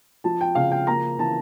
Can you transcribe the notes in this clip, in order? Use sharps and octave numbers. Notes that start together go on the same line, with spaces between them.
F3 A5
G5
C#3 F5
G5
A#3 A#5
E3 A5